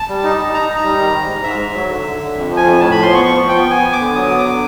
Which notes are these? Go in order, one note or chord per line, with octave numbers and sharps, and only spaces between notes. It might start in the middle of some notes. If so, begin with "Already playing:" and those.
Already playing: A5
G3
D#4
D#4
D#4 A#5
D#4
A#5
G3
D#3
G#2
G#2
G#2 E5
G#2
F#3
D3
D3
D3
F2
F3
G#5
F2
A2 A5
F3 B5
C6
B3 C#6
F3 C#6
F3
G5
B3
B3 G#5
B3
D6
D3
F#3 D#6
B3
D6
D3